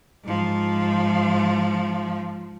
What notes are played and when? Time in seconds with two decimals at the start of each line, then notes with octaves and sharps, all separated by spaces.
0.24 G#2 F3